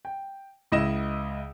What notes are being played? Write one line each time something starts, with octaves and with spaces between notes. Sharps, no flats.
G5
C#2 E4 D#5 A#6 E7